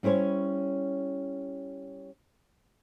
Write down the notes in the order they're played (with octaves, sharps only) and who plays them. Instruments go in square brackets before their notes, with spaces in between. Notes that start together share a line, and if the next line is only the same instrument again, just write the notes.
[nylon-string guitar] G3 C#4 E4 C5 C#5